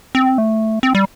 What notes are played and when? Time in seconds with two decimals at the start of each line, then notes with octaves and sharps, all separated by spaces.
0.15 C4
0.38 A3
0.83 C4
0.95 G3